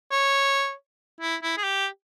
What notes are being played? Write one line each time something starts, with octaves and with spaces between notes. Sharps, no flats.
C#5
E4
E4
G#4
G4